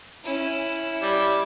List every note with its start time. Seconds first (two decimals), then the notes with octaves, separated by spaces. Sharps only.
0.24 C#4 E4
1.02 G3